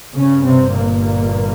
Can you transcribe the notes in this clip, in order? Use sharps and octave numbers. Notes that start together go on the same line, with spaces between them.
G1 G2 C#3 C#4
C3 C4
A#2 A#3